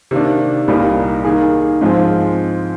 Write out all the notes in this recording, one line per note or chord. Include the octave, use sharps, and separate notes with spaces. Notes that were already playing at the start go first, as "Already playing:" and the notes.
C3 D#3 A#3 D4
C2 A#2 G3 A#3 D#4
D#3 A#3 D#4 G#4
G#2 F3 C4 F4 G#4